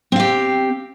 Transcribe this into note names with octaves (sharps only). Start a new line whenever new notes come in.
C4 G4 F5